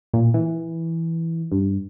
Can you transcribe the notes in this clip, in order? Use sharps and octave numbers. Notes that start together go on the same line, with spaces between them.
A#2
E3
G2